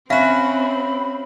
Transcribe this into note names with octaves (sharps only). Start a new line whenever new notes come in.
C4 C#4 F#4 E5 F5 B5